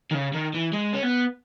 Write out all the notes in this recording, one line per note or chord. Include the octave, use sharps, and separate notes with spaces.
D#3
C#3
D#3
E3
G#3
C#4
B3